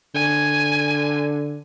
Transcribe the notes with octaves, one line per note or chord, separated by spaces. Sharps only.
D3 G#5